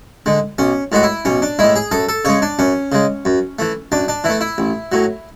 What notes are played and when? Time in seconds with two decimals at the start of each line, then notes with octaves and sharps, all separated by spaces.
0.26 D3 G#3
0.58 B1 C#4
0.92 A2 G#3 F#4
1.03 E4
1.25 B1 C#4
1.42 D4
1.59 A2 G#3 E4
1.76 G#4
1.92 F#2 A4
2.09 A4
2.25 C#3 G#3 C#5
2.42 D4
2.59 F#2 C#4
2.92 C#3 G#3
3.25 F#2
3.59 E3 A3
3.92 F#2 D4
4.08 D4
4.24 E3 A3 E4
4.41 E4
4.58 A1
4.92 A2 F#3